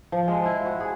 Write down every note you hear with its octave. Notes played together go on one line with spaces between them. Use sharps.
F3
G#3
E4
F#4
G#4